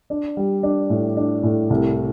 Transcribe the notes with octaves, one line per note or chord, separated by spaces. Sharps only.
D4
G3
D4
A2
D4
A2
C2